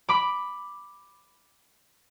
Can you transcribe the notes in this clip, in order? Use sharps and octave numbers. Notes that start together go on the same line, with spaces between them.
B5 D6